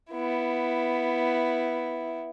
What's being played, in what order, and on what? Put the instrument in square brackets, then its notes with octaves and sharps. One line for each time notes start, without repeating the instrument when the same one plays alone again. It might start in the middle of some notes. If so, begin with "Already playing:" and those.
[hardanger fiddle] B3 E4